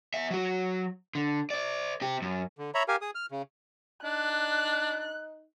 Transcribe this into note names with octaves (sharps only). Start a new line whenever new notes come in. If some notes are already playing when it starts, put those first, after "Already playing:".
B3 E5
F#3 F#4
D3
C5 D5
C4 G4
F#2
D3
C#5 E5 A#5 B5
G4 A#4 F5 G#5
G#4 D#6
F6
C#3
D4 D#4 F#6